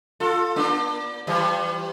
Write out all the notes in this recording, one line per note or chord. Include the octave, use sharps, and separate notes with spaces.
F4 A4
A#3 D4
E3 G3